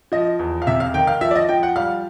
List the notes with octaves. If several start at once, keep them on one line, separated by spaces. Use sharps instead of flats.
F3 D#5
E2
F5
C3 E5
F5
D#3 G5
F5
F3 E5
D5
D#5
F3 G5
F#5
G3 F5